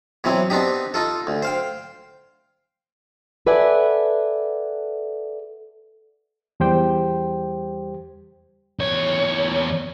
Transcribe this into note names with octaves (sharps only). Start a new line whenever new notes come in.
B2 E3 F#3 C4
B3 C4 D4 D#4 G4
D#4 F4 A4
D2
C5 F5 G5
A4 B4 D5 E5 F#5 G#5
E2 G3 G4 C5 G5
E2 C#5